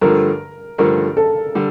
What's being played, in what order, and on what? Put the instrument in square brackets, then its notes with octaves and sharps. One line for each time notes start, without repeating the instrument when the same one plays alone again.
[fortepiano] G2 D3 F3 A3 [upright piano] A#4
[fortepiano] G2 D3 F3 A3 [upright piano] A#4
[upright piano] A4
[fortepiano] D3 G3